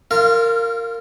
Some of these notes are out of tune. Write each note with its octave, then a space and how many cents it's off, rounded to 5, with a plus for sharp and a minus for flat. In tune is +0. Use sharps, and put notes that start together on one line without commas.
F4 +0 A#4 -20 F5 -35